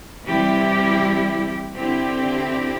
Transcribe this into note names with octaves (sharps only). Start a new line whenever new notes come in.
C3 E3 G3 E4 G4
D3 C4 E4 G4